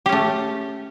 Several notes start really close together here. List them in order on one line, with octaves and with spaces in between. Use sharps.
G4 C#4 A3